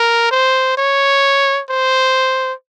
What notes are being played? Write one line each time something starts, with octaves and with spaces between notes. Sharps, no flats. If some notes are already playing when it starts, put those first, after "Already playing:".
Already playing: A#4
C5
C#5
C5